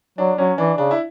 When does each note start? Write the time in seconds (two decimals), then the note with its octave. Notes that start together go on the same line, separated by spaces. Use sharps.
0.18 F#3 D4
0.38 F#3 C#4
0.58 E3 D4
0.78 C#3 D4
0.91 E4